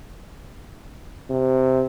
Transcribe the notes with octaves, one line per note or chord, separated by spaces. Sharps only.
C3